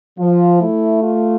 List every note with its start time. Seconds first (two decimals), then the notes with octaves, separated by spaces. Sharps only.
0.19 F3 F4
0.60 A3 E4
1.03 F4